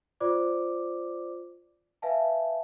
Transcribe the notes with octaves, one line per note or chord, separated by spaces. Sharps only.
F4 C5 D5 D6
B4 E5 F5 G#5 A5